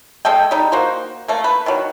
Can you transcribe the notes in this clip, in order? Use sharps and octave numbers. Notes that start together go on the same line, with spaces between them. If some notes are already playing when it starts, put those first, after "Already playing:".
G#3 A4 D#5 G5
G3 D#4
A#3 F#4 C5
A3 A#3
B4
D#3 F#3